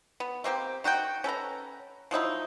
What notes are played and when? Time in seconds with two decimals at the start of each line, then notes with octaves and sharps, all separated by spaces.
0.20 B3
0.44 A3 A#3 C4 G4
0.84 D#3 F#4 G4 G5
1.24 C#4 A4 B4 A#5
2.11 F3 F#3 D#4 E4